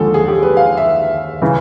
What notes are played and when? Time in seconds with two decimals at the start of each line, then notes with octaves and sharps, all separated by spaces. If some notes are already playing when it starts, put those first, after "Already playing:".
Already playing: D#2 D3 F3 G#3 G#4 A4
0.14 G#4
0.28 G4
0.43 B4
0.57 F5
0.77 E5
1.42 C#3 E3